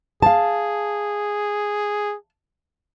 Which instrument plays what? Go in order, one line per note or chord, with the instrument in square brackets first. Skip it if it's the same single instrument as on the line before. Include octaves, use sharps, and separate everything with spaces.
[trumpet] G#4 [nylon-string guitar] F5 A5